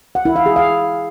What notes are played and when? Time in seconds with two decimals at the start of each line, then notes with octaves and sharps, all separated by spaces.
0.15 F#5
0.25 E4
0.36 F5
0.46 G#4
0.56 F5